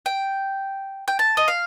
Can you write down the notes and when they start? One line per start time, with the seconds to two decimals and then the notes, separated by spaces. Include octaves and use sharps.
0.06 G5
1.08 G5
1.19 A5
1.37 D#5
1.48 F5